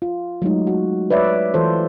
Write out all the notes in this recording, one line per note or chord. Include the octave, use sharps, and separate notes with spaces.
F4
F#3 G#3 A3 D#4
F#4
B4 C#5 D5 E5
E3 F4 A4 C5